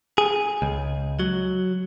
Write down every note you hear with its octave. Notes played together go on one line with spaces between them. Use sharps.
G#4
C#2
F#3